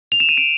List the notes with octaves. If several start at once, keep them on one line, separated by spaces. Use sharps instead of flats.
F7
E7
D#7
D7 E7